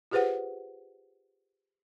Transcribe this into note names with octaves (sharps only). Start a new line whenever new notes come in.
F4 G4 G#4 B4 C5 F#5